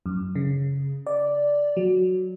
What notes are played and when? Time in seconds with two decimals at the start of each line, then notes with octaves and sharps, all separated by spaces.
0.06 F#2
0.35 C#3
1.06 D5
1.77 F#3